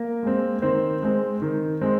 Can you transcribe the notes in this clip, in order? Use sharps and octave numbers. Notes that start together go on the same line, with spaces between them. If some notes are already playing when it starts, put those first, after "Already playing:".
Already playing: A#3 A#4
G#3 C4
D#3 C4 C5
G#3 C4
D#3
G#3 C4